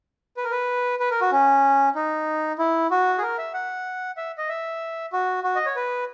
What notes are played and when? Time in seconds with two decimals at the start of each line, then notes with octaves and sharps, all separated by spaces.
0.37 B4
0.44 A#4
0.51 B4
1.00 B4
1.11 A#4
1.21 F#4
1.32 C#4
1.95 D#4
2.59 E4
2.91 F#4
3.18 G#4
3.22 A#4
3.38 E5
3.54 F#5
4.17 E5
4.38 D#5
4.49 E5
5.13 F#4
5.44 F#4
5.56 D#5
5.66 C#5
5.76 B4